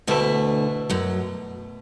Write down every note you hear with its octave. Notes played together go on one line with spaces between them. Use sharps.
D2 B2 D3 A3 E4
F#2 F#3